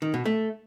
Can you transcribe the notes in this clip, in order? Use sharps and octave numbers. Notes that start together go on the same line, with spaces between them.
D#3
B2
A3